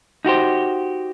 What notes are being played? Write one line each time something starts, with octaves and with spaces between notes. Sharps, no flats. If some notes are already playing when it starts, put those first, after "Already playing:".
D#4 F#4 G4 C5